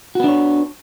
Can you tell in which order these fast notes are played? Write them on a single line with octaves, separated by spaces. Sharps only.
F#4 B3 D4 C#5